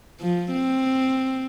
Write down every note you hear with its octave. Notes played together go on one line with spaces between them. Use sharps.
F3
C4